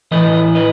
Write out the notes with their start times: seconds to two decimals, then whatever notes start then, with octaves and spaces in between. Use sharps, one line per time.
0.11 A2 E3 A3 B4 D#5
0.55 B4 D#5